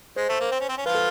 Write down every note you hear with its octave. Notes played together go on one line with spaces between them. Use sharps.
G#3 C5
A3
A#3
C4
C#4
C4
C#4
F3 F4 B4
A4